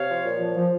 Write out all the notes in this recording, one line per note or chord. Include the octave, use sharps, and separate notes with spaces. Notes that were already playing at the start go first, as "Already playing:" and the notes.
Already playing: C3 C#5 F5
F3
A#2
F3
F3